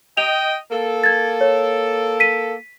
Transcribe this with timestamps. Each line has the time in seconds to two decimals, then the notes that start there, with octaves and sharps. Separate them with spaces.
0.17 D#5 G5 F7
0.72 A#3 A4
1.04 G#6 A6
1.41 C#5
2.20 B6 D#7